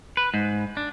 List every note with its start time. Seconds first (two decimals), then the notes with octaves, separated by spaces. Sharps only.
0.17 B4
0.34 G#2
0.77 D4